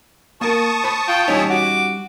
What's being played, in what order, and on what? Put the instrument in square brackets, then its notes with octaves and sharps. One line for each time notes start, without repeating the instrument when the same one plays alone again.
[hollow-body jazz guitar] A#3 A#4 [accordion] A5 C#6 D#6
[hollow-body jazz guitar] C5 B5
[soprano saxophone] F4 [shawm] G5
[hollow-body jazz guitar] G3 C#4 D#4 [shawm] E4 [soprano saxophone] C#5
[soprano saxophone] F#4 [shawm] D6